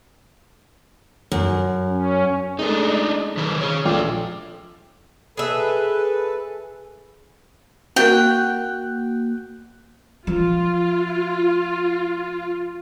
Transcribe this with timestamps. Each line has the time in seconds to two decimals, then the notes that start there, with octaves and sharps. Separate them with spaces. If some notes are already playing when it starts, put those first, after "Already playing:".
1.32 F#2
1.88 C#4
2.59 G#3 A3 D4 D#4
3.37 D#3 B4 C5
3.61 G#4 C#5
3.85 A#1 F4 A4 G5 D6
5.37 G#4 A4 B4 E5
7.96 A#3 F#4 G5 F#6
10.27 F3 F4